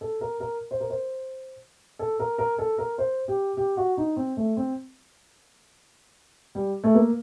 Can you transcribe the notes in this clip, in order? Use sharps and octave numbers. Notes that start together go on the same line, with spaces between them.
A4
A#4
A#4
C5
A#4
C5
A4
A#4
A#4
A4
A#4
C5
G4
G4
F#4
D#4
C4
A3
C4
G3
A3
A#3